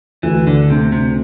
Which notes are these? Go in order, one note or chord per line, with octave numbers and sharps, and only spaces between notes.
D2 E3
D3
C3 A3
C3